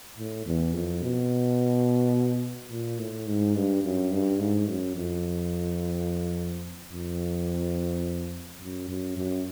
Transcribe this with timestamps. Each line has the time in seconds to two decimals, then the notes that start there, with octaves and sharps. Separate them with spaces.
0.18 A2
0.46 E2
0.74 F2
1.02 B2
2.71 A#2
2.99 A2
3.27 G#2
3.56 G2
3.83 F#2
4.12 G2
4.39 G#2
4.68 F#2
4.96 F2
6.92 F2
8.61 F#2
8.89 F#2
9.17 F#2